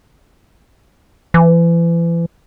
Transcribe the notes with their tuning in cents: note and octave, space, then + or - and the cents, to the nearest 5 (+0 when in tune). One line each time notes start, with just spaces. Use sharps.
E3 +35